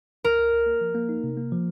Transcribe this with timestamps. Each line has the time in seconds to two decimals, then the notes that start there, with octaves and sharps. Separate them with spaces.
0.24 C#2 A#4
0.39 C#2
0.53 C#2
0.66 A#3
0.81 F3
0.95 A#3
1.09 D#4
1.24 C3
1.37 A#3
1.52 F3